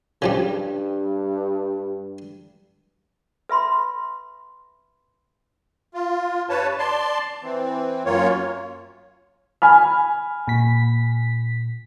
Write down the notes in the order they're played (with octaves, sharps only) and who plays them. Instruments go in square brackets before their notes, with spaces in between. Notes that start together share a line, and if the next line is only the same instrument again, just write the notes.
[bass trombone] G2 [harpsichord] C#3 F3 G3
[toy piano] B4 E5 B5 C6
[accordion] F4
G2 B4 C#5 A5
D5 A5 C6
E3 C4
F#2 A#3 F4 C#5
[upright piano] G#5 B5 F6
[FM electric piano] A#2 B6